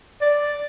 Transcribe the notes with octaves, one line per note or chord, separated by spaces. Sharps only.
D5